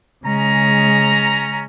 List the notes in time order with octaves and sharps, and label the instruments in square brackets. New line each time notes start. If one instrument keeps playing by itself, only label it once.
[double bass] C#3 G#3 [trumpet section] C#4 A#5